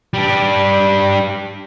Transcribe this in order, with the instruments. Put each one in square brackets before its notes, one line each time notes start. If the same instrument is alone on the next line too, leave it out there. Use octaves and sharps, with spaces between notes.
[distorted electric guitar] G3 D4